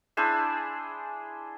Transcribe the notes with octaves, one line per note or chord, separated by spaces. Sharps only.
D4 E4 G#4 C5